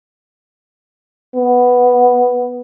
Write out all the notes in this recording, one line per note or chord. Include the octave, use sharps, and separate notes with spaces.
B3